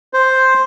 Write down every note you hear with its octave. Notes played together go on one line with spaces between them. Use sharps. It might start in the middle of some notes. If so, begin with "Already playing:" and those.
C5